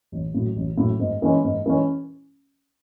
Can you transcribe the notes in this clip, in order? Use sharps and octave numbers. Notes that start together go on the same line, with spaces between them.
A1
A2 F#3
A1
A2 F#3
G#2
E3 G#3 C#4
G#2
E3 G#3 C#4